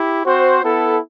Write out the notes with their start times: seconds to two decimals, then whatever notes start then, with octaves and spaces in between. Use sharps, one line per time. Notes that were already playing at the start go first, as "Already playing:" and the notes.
Already playing: E4 G4
0.24 C4 F#4 C5
0.62 B3 E4 A4